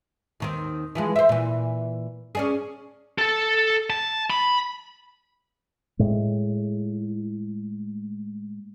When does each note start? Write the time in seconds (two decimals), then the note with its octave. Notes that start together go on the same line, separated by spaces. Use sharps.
0.40 D#2 D#3 C4
0.95 E3 F3 G#3
1.16 C5 E5
1.29 A#2 E3
2.35 C#4 D4 G#4
3.18 A4 A5
3.90 A5
4.30 B5
5.99 A2 G#3